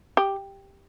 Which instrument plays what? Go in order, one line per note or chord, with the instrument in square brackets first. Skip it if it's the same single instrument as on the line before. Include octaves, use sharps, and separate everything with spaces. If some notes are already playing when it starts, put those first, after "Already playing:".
[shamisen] G4